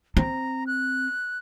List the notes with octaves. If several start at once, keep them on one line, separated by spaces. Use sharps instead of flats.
C4 A#5
F#6